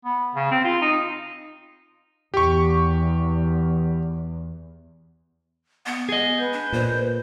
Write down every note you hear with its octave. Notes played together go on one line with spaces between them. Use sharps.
B3
C#3
C4
F4
D#4
E2 G4 C#6
B3
G#4 D#5
B4 G6
D4
A#2 C5